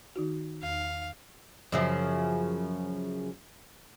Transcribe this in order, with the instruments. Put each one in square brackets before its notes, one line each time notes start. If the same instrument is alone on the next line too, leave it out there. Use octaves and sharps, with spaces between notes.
[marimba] D#3 D#4 F#4
[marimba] E2 [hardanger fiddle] F5
[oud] F#2 C#3 F3